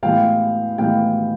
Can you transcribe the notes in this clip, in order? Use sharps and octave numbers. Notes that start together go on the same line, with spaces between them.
A2 E3 G#3 B3 F5 G5
A2 E3 G#3 B3 F5 G5